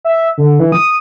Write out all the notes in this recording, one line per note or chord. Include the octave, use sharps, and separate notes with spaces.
E5
D3
E3
D#6